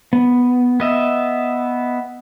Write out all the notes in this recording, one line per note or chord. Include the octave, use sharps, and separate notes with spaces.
B3
B3 D#5 E5